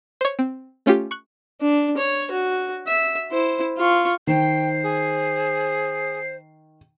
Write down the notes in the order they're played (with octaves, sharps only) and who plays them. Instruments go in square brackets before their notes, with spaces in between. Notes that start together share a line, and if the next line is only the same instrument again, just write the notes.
[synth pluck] C5 C#5
C4
A3 C#4 F4 G4
C#6 F#6
[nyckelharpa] D4
C#5
F#4
E5
E4 C5
F4 C#6
[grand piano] D#3 [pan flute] C5 [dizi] G5 [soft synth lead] C7
[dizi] G#4